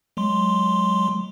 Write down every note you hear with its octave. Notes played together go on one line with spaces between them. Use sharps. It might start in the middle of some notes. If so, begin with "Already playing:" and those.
F#3 G#3 C6